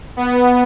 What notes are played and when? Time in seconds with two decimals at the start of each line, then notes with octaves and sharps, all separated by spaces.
0.17 B3